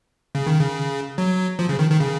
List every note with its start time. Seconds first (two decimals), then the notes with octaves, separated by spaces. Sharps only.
0.35 C#3
0.47 D#3
0.60 C#3
1.18 F#3
1.59 F3
1.69 C#3
1.79 D#3
1.90 D#3
2.00 C#3